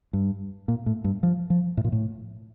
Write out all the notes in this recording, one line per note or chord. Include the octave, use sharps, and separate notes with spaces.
G2
A#2
A2
G2
F3
F3
A2
A#2
A2